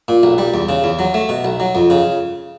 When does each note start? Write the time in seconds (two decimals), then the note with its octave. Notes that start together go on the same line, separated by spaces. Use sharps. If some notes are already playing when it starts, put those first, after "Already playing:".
0.08 A#2
0.23 B1
0.38 G3
0.54 E2
0.69 C#3
0.84 E2
0.99 F#3
1.14 A3
1.29 B2
1.44 B1
1.60 F#3
1.75 F2
1.90 C#3